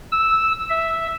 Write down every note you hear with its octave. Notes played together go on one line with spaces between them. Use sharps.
E6
E5